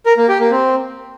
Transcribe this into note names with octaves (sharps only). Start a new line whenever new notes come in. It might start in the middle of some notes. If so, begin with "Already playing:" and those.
A#4
A#3
G4
A#3
C4